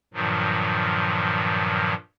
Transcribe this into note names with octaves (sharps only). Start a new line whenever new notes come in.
G2 A#2 D#3 F3 F#3